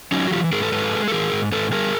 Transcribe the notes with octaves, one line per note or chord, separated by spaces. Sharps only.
F#3 C#4 D#4
F#4
E3 F4 G4
G#2 G#4 A#4
A4 B4
G#2 A4 B4
G#3
A4
E3 G#4 A#4
G#2
G#2 A4 B4
G3 G#4 A#4